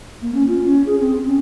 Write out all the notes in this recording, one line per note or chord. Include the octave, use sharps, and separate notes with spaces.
A#3
C#4
F4
C#4
G#4
C4
C#4